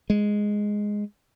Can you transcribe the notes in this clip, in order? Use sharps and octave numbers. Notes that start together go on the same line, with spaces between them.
G#3